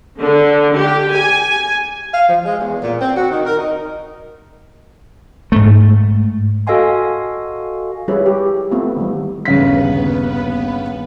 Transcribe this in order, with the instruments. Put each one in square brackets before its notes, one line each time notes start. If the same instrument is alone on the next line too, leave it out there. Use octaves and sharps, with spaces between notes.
[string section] D3
G4
G#5
[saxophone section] F5
F3
G#3
E2
A#2
C4
F#4
D#3
A#4
D#4
[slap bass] G#2 A3
[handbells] F#4 A4 D#5 F5 G#5 C6
[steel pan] F3 G3 E4 G#4 B4 C#5
G4
A3 B3 C4 E4 F4
D#3 E3 G3
[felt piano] G1 C#3 B6 [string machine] D#2 B3 B4